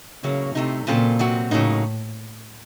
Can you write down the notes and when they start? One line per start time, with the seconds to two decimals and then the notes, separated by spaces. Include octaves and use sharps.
0.24 A2 C#3 F#3 A#3
0.55 A2 C3 F3 A3 D#4
0.87 A#2 C#3 F#3 C4 F4 A4
1.19 C3 F#3 C4 F#4
1.51 A2 C#3 F#3 A#3 D#4